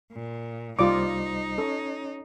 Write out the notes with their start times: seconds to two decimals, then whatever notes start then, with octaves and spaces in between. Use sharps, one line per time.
0.12 A#2
0.79 C2 G3 D#4 F4 C5 D5 D6
1.58 C#4 A4 C#5